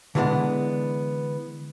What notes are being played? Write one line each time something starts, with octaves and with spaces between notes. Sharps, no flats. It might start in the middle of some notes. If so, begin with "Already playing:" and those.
D3 E3 G3 G#3 B3 D4